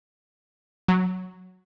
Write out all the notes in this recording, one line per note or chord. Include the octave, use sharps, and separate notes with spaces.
F#3